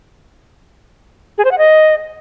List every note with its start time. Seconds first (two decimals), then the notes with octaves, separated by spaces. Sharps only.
1.38 G#4
1.45 C5
1.51 F#5
1.58 D#5